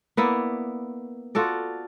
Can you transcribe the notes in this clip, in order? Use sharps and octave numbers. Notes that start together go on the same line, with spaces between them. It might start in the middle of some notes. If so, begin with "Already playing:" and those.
A#3 B3 E4 D5
F4 F#4 A4 D5